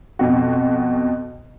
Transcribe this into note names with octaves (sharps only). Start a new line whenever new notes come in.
F2 B2 F#4